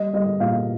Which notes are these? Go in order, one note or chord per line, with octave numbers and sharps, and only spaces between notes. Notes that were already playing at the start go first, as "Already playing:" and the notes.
Already playing: G3 D#5
G3 D#5
A#2 F5